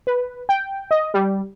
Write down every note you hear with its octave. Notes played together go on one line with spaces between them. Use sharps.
B4
G5
D#5
G3